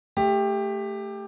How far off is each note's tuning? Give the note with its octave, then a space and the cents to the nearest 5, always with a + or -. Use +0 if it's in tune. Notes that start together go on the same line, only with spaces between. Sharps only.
A3 +0 G4 +15